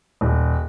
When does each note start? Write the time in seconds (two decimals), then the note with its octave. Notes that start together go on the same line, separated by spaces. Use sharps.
0.21 D#1